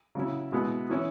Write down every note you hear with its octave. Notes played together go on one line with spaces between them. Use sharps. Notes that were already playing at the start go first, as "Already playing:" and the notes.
C#3 F#3 C#4 E4
B2 G#3 B3 E4
E3 C#4 E4